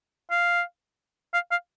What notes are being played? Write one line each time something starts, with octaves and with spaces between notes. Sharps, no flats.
F5
F5
F5